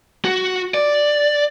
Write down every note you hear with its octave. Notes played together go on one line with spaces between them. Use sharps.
F#4
D5